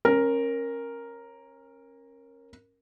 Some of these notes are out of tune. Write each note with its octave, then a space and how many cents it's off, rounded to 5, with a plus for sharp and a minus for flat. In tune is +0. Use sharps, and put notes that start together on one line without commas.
C#4 -30 A#4 +0